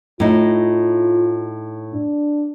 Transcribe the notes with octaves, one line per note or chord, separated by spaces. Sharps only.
A2 D#4 F4
D4